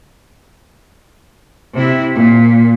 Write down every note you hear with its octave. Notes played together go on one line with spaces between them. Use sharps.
C3 E4
A#2